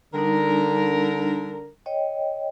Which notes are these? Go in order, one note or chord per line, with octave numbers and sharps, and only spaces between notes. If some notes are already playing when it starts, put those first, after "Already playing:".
D3 G3 D4 D#4 A#4
C#5 D#5 G5